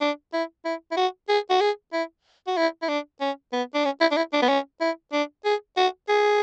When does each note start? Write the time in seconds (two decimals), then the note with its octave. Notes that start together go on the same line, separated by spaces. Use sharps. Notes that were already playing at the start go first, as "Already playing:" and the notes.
0.01 D4
0.33 E4
0.65 E4
0.91 E4
0.97 F#4
1.29 G#4
1.50 F#4
1.61 G#4
1.93 E4
2.47 F#4
2.57 E4
2.82 E4
2.89 D4
3.21 C#4
3.53 B3
3.74 D4
3.85 C#4
4.01 E4
4.11 D4
4.17 E4
4.33 D4
4.42 B3
4.49 C#4
4.80 E4
5.12 D4
5.45 G#4
5.77 F#4
6.09 G#4